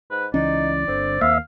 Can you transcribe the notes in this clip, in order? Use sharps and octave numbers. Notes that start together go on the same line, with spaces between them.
G#2 B4
C#2 E3 C#4 D#4 D5
G1 D3 C4
D#2 A#3 E5 F5